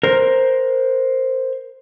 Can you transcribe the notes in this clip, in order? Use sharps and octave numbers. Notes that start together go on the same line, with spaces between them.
A#4 C5